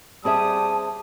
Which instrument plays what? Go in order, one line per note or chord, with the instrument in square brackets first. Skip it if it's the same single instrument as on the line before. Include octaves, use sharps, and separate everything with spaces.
[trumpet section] G3 D#6 [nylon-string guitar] C4 G#4 E5 [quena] A5